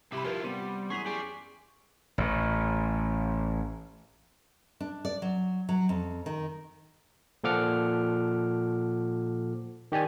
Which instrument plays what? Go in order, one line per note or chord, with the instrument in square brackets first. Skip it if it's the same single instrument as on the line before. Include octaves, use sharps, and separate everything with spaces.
[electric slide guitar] C3 G3 E4 [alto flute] G4 [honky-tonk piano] B5 C6 D6
[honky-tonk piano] F3 A#4 B4 [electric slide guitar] E4 F4
[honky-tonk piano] C3 D#7 [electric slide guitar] G3 [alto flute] B3 [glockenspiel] C6
[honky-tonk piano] F#2 E3 F7 [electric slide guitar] G#4 [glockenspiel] C#6 B6
[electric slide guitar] G4 D5 [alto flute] G#4 [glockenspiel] G#5 C7
[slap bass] A1 A2
[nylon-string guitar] D4
D5
F#3
F#3
F2
D#3
[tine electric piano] A#2 F3 A4 F#5 D6 F6
D#3 G4 D5 G#5